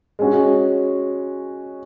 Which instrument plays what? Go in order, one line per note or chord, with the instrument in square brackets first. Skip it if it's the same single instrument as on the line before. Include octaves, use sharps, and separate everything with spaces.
[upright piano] G#3 C#4 F#4